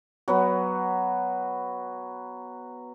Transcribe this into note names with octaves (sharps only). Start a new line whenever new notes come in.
F#3 B3 B4